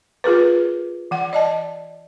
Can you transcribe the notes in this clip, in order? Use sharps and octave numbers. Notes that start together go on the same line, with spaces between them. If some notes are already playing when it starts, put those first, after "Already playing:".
F4 G#4 A#4 B4
E3 F#5
D5 D#5 A5